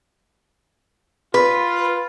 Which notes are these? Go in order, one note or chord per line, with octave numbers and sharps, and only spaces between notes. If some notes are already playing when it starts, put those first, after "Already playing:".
F4 B4